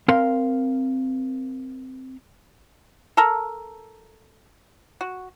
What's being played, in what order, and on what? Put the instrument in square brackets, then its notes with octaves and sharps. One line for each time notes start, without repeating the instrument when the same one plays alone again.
[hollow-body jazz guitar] C4 A#4 F5 C6
[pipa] A4 A#4
F#4